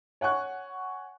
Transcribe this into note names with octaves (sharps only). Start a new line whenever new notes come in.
C#5 F#5 G#5 C#6 F#6